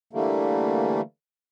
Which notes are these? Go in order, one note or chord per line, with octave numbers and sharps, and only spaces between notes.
D3 E3 G3 A3 A#3